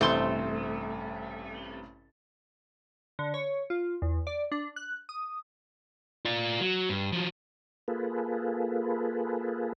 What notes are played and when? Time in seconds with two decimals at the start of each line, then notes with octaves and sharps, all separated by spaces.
0.01 A1 G2 C3 A3 C5 C6 G6
3.19 D3
3.34 C#5
3.70 F4
4.02 E2
4.27 D5
4.52 D4
4.76 F#6
5.09 D#6
6.25 F4 D5
6.61 F#3
6.89 G2
7.12 F3 F#3
7.88 A#3 F4 G#4 A4 B4